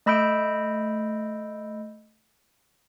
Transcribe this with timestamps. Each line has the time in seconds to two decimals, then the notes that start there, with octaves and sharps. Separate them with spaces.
0.06 A3 D#5 B5 E6 G6 D7